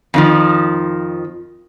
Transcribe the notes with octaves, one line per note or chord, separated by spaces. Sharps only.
F2 D#3 F3